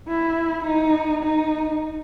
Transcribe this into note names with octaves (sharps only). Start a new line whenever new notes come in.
E4
D#4
D#4